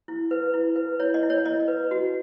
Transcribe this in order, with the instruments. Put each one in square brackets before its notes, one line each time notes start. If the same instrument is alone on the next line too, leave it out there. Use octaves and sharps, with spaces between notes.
[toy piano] E4
B4
E4
B4
E4 C#5
D#5
E4
C#5
E4 D#5
B4
F#4